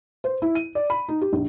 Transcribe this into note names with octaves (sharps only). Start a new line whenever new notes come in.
C5
E4
D#7
D5
B5
D#4
G4
A#1